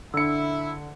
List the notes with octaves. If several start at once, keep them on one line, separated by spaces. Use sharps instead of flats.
D3 D4 E4 E6 C#7